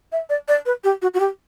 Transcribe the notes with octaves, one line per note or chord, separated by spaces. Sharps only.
E5
D5
D5
B4
G4
F#4
F#4
G4